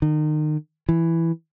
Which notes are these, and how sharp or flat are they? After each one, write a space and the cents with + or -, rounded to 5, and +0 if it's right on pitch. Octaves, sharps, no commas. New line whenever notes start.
D#3 -30
E3 +5